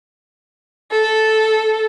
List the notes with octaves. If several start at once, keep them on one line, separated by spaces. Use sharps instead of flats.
A4